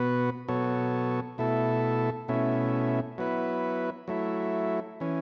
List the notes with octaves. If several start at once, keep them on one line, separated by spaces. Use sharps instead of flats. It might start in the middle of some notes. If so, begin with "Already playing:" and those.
Already playing: B2 B3 F#4 B4
B2 F#3 B3 A4 C#5
B2 A3 E4 A4
B2 A3 C#4 E4
F#3 B3 E4 B4
F#3 A3 E4
E3 C#4